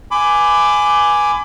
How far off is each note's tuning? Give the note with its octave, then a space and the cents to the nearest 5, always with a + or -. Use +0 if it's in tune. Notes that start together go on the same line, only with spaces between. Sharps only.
G#5 +0 B5 +30 D6 +0